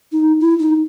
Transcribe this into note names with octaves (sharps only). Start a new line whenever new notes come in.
D#4
E4
D#4